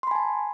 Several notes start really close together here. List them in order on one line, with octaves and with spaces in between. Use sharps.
C6 B5 G#5 A5